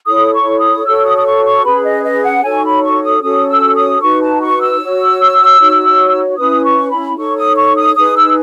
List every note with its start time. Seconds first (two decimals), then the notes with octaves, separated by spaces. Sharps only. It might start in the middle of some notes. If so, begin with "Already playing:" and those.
0.06 E4 A4 C#5 D#6
0.33 C#6
0.59 D#6
0.85 F#4 A4 C#5 E6
1.05 D#6
1.17 D#6
1.24 C#6
1.45 C#6
1.64 C#4 G#4 B4 B5
1.84 D#5
2.04 D#5
2.24 F#5
2.43 D#4 F#4 A4 C#5 G#5
2.54 C#6
2.63 B5
2.83 C#6
3.03 D#6
3.22 C#4 F#4 A4 C#5 D#6
3.48 E6
3.75 D#6
4.01 D#4 F#4 B4 C#6
4.21 A5
4.41 C#6
4.60 E6
4.80 F#4 C#5
5.59 D#4 F#4 C#5
6.38 C#4 E4 B4 D#6
6.65 C#6
6.90 B5
7.17 D#4 A4 C#5 C#6
7.36 D#6
7.56 C#6
7.76 D#6
7.96 D#4 G#4 B4 D#6
8.16 E6